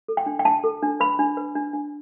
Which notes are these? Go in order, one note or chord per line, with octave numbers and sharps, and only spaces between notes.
A4
G5
D4
G5
D4 A5
A4
D4
B4 B5
D4
B4
D4
D4